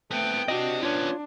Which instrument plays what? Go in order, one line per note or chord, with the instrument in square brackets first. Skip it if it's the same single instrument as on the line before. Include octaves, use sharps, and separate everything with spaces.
[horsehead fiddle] A3 G5 [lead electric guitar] B3 C4
[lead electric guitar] C4 G4 [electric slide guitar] D4 D#5 [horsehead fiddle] F#4
[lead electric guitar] B3 C#4 [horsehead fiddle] D4 [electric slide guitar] F4 C#5